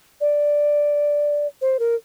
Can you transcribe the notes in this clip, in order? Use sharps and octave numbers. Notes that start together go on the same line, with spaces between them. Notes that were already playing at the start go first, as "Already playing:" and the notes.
D5
C5
A#4